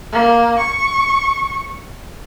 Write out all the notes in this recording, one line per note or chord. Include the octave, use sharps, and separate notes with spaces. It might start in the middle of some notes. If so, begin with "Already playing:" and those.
A#3
C#6